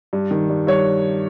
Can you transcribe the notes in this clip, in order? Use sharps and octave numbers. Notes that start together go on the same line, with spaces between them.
G2
D#3
G2
G2 C#5